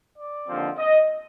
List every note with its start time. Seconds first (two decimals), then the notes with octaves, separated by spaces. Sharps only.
0.18 D5
0.48 D#2 D3 F3 C4
0.78 D#5